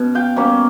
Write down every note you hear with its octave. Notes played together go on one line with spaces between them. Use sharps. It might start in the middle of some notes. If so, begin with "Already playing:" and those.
Already playing: B2 C#4
F5 G5
B2 G3 A#3 C#4